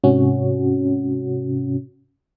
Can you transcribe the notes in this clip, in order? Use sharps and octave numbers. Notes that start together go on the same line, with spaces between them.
G#2 C3 C#4 F#4